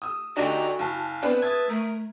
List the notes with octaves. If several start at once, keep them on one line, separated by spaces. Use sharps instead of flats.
D#6 E6
D2 D4 D#4 F#4 G4 A#5
F#1 F5 A5
B3 C4 D4 B4
E5 A5 D#6 G#6
A3 A#4